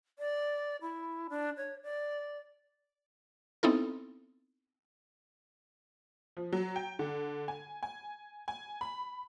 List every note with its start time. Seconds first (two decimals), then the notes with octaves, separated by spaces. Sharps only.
0.19 D5
0.82 E4
1.30 D4
1.57 C#5
1.83 D5
3.63 B3 C4 D#4 E4 A4
6.37 F3
6.53 F#3
6.76 G5
6.99 D3
7.48 G#5
7.83 G#5
8.48 G#5
8.81 B5